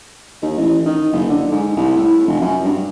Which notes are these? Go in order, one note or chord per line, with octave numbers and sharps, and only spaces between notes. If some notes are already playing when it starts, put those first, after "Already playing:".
D#2
A1
D#3
F#1
D3
G#2
C2
A2
F1
F#2
G2